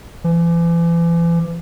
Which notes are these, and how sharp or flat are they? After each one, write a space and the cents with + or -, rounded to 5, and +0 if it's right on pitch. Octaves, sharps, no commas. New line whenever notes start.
E3 +40